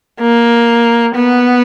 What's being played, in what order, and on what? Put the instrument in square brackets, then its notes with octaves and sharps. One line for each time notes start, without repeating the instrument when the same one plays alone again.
[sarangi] A#3
B3